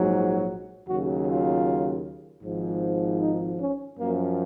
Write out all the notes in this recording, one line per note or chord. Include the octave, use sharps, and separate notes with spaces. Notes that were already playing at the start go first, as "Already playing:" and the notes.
Already playing: A#1 G#2 F#3
D#2 C#3 F#3 F#4
F4
G#1 G#2 F3
D#4
C#4
F#2 F3 A#3